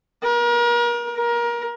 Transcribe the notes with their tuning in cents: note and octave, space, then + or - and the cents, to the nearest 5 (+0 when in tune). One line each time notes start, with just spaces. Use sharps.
A#4 +35
A#4 +25